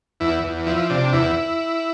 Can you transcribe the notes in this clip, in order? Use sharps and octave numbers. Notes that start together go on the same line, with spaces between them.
E2 E4
E2
F3 E4
C3 D4
E2 E4